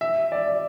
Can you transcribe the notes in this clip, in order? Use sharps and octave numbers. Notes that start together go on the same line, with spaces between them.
E5
D5